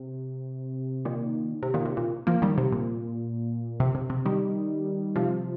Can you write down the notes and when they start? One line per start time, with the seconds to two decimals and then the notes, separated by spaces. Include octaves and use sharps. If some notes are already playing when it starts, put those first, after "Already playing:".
Already playing: C3
1.05 A#2 D#3
1.63 C3
1.74 A#2 D#3
1.85 C3
1.97 A#2
2.27 F3 A#3
2.42 D#3 G3
2.58 C3
2.72 A#2
3.80 C3
3.95 C3
4.10 C3
4.26 D#3 G3
5.16 C3 F3